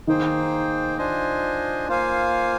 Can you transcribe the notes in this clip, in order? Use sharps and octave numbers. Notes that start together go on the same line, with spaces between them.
D#3 A#3 D#4 G#4 C5 G5
D4 F4 C5 D#5 G#5
A#3 F4 C5 F5 G#5